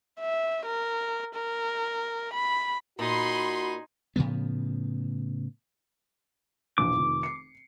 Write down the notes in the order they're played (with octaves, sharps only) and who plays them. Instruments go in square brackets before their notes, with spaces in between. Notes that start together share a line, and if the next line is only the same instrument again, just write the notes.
[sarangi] E5
A#4
A#4
B5
[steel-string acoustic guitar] A#2 [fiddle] D#4 G#5 [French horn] F#4 [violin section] B5 C6
[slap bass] A2 C#3 F3 B3
[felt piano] A#1 E2 B2 [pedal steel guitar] D6
[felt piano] F1 F2 D#3
C7 C#7